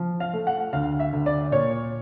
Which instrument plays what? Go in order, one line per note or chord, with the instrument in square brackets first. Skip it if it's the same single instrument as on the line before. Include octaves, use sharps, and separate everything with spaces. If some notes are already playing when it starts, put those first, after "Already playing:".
Already playing: [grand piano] F3
F5
A3
F#5
D2 F5
E5
D2
D5
A#2 C#5